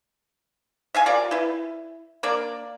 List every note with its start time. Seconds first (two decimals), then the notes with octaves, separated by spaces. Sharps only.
0.95 E5 F5 G#5
1.06 F4 G4 A#4 D5
1.31 E4 B4
2.23 A#3 D4 A#4 D5